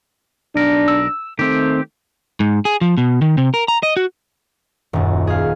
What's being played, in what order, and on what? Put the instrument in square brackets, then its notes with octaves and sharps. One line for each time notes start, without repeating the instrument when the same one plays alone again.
[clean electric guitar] B1 A#4 [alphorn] D4
[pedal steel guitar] E6
[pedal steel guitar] D#3 C4 [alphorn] A3 [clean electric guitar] G4
[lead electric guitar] G#2
G#4
F3
B2
D#3
C3
A#4
A#5
D#5
F#4
[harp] D#1 F#2
G#4 F5